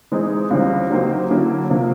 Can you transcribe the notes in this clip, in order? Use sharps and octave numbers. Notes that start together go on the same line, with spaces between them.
E3 G#3 C4 D#4 G#4
C#2 C#3 E3 G3 C4
F#3 A#3 D#4 G4 C5
D3 F#3 A#3 C#4 E4
C3 F3 A#3